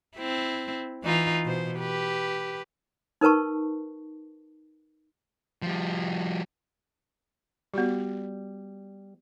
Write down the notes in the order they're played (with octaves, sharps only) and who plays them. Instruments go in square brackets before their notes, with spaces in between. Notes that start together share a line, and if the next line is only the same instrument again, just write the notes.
[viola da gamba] C4 E4
E3 D#4 F4
B2 C5
G4 B4
[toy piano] D#4 A#4 B4 A5 C#6
[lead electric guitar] F3 G3
[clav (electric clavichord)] G3 [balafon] B3 F#4 G4